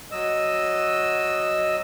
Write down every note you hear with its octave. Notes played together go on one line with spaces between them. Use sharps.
F#3 D#5 E6